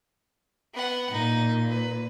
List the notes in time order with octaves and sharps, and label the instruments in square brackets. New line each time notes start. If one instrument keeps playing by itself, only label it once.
[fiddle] B3 F#5
[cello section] A#2 [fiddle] D#4
[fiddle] B4